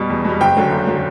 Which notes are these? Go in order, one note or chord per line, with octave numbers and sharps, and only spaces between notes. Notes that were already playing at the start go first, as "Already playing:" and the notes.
Already playing: B2 G3
E2
B2 G3
F#1 G5
F#2 D3 F#3
F#1
D3 F#3